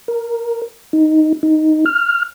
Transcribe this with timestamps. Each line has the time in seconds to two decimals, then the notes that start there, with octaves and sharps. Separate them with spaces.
0.08 A#4
0.93 D#4
1.43 D#4
1.86 F6